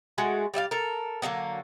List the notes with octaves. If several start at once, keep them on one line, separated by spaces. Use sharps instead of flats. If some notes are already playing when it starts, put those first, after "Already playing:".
G#3 A3 F#4
G3 D5 E5 F5
A4 A#4
D3 F#3 A#3 B3